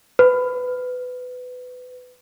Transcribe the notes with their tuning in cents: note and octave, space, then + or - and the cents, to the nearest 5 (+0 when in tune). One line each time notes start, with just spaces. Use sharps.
B4 +20